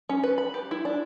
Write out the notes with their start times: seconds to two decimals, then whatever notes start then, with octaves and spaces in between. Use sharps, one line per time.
0.09 C#4
0.23 B4
0.38 B5
0.54 G4
0.71 E4
0.85 D4